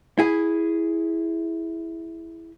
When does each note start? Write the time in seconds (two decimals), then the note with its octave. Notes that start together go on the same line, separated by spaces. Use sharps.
0.19 E4 G#4